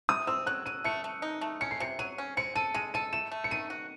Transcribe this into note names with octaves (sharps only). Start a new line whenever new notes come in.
C3 D#6
C4 E6
F#3 F#6
F#3 D#7
A3 C#7
A3
D#4
A3
C#4 C#7
C7
C3 C#7
F#3 D#7
C#4
C4 C#7
A4 D#7
G#3 D#7
A4 D#7
A3 E7
A3
C#7
D#3 D#7
F#4